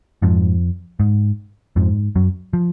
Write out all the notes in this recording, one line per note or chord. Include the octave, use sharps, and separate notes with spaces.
F2 G#2 F3
G#2
F2 G#2 F3
F#2 F#3
F3